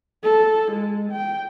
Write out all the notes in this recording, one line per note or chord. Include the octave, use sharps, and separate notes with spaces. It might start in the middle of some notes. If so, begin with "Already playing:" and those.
A4
G#3
G5